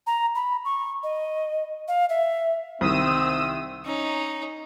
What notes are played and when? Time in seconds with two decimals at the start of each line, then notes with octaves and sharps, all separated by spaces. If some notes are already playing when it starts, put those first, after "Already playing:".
0.07 A#5
0.35 B5
0.65 C#6
1.03 D#5
1.88 F5
2.09 E5
2.81 C2 D#3 C4 D#6 E6 D#7
3.85 C#4 D#4